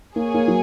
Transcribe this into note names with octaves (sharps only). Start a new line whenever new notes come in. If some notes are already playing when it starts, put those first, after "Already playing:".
A#3 G#4 C#5 G#5
A#3
F#3